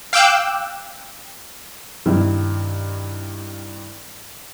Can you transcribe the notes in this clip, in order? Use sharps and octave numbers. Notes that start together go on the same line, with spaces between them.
F5 G5 D6 E6 F#6 G6
G2 C3 D#3 E4